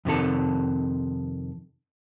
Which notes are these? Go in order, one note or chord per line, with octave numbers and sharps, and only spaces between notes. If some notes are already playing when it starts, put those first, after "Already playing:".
F2 C3 D#3 A4